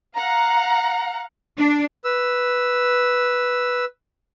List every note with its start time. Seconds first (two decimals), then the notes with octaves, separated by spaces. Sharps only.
0.16 F5 F#5 A#5
1.59 D4
2.04 B4 E6